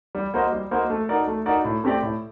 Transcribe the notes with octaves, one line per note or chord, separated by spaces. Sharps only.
G3
A#3 F#4 C5 D#5
G3
A#3 F#4 C5 D#5
A3
D#4 F#4 A#4 D5
A3
D#4 F#4 A#4 D5
A2
A3 C4 G4 D5
A2